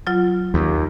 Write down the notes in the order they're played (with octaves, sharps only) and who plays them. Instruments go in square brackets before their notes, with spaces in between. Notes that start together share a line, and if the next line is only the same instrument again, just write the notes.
[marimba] F#3 F4
[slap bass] D#2